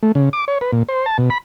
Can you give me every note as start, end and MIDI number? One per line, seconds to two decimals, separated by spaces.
0.03 0.12 57
0.15 0.29 49
0.33 0.45 86
0.48 0.58 73
0.61 0.71 71
0.72 0.83 46
0.89 1.06 72
1.06 1.17 81
1.18 1.30 47
1.30 1.38 83